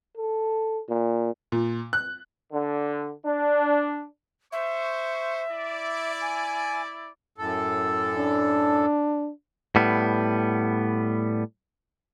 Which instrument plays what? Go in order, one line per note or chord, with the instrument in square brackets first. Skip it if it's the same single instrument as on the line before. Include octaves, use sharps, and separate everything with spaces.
[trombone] A4
A#2
[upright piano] A#2
F#6
[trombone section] D3
D4
[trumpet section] C5 C#6 [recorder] E5
[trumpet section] E4 D5
[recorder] G#5
[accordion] F#2 A2 A4
[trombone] D4
[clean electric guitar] A2 G3 B3